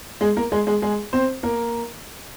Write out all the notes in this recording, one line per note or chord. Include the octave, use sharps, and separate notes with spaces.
G#3 G#4
A#3 A#4
G#3 G#4
G#3 G#4
G#3 G#4
C4 C5
A#3 A#4